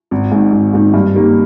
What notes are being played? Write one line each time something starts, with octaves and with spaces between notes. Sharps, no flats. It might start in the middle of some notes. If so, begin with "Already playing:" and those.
G#1
G#2 D#3
G#1
G#2 D#3
G2
D#3 G3 A#3